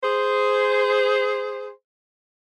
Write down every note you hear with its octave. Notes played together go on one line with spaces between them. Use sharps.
G#4 C5